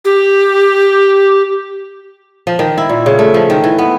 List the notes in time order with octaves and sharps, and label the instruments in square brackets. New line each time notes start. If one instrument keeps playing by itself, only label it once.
[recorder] G4
[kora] F3
D#3
E4
A#2
C#3
A3
F3
D#3
E3
B3